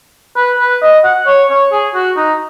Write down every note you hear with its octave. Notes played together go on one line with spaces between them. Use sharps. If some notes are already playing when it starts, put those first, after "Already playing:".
B4
B4
D#5
F#5
C#5
C#5
G#4
F#4
D#4